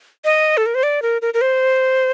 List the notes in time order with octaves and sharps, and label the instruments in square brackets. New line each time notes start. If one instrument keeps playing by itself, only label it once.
[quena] D#5
A4
A#4
C5
D5
A#4
A#4
A#4
C5